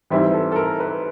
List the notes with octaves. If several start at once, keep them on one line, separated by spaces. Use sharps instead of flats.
G#2 E3 G3 C4 E4
A4
A4
A#4
B4